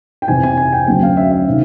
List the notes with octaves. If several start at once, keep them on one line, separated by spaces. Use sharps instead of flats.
G5
F2 C3 E3 G#5
G#5
G#5
G5
D2 C#3 F#3 G5
F5
E5
E5
C3 D#3